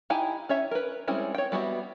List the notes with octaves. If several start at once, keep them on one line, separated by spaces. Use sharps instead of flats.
D#4 E4 G4 G5 G#5
C#4 C#5 E5
A#4 B4
G3 G#3 C4 C#4 E4
C#5 G5
G3 B3 F#4 E5